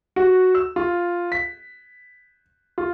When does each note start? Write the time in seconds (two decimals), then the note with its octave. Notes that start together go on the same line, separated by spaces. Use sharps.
0.16 F#4
0.55 E6
0.76 F4
1.32 B6
2.78 F4